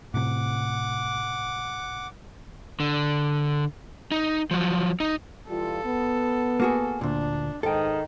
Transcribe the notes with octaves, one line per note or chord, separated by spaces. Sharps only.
A2 C3 F#5 D6
D3
D#4
F3 F#3
D#4
E3 G3 F4 A4
B3
A#3 F#4 G#4
D2 A#2 D4
G#2 D#3 A4 G5